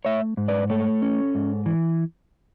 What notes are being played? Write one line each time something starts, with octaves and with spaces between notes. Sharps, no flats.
A3 C#5 E5
G#2
B4 D5
A3 A4 C#5
C#4
G#2
E3